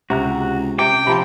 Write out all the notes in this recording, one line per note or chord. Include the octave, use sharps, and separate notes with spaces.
C#2 C3 F#4 A#5 F#6
C3 G5 D6
C3 F3 C4 A#5 B5